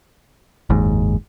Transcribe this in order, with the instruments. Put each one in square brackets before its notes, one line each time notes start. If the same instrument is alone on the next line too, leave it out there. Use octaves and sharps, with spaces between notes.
[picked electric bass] F#1 D#2 G#2